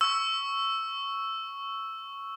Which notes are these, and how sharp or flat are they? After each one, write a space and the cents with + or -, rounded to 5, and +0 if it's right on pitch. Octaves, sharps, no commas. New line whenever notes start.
C#6 +0 E6 +0